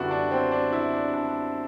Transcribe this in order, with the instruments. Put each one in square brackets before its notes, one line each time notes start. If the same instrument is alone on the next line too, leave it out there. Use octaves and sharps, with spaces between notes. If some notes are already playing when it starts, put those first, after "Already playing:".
Already playing: [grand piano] F#2 D3 G3 B3 D4 E4 F#4
D4
C4
D4
E4
D4
D4